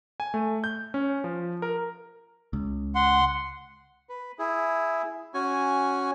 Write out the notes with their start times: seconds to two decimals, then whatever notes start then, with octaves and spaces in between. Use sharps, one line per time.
0.20 G#5
0.34 A3
0.64 G6
0.94 C#4
1.24 F3
1.62 A#4
2.53 C#2
2.95 F#5 C6
4.09 B4
4.39 E4 G#4
5.34 C#4 F#4 G#5